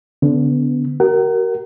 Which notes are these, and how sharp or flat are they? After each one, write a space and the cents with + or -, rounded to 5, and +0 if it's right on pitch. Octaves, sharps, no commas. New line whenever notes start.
D3 -25 B3 +10
F#4 +45 A#4 +0 F#5 +35